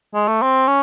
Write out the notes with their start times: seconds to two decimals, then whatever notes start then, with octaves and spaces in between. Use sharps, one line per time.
0.14 G#3
0.28 A3
0.42 C4
0.68 C#4